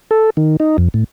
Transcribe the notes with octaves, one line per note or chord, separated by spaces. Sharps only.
A4
D#3
D#4
F2
A2